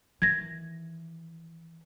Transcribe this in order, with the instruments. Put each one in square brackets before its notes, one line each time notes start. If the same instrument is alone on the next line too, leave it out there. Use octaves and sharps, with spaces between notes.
[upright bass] D#3 E3 [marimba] G#6 A#6